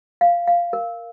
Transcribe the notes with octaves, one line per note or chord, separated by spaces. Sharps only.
F5
F5
A#4